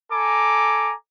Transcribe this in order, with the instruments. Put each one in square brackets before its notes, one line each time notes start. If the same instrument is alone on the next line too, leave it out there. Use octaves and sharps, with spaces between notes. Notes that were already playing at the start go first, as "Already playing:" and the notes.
[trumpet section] A4 G#5 A#5 D6